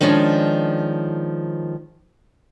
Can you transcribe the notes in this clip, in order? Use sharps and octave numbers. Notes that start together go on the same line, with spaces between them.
D#3 F3 G#3 C#4 D4